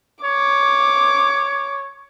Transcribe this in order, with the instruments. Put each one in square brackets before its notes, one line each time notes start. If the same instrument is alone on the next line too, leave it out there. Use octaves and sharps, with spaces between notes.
[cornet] C#5 [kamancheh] D6